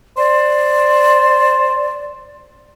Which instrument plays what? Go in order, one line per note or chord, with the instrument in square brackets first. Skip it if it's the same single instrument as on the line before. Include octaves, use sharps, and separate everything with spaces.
[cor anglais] C5 [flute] D5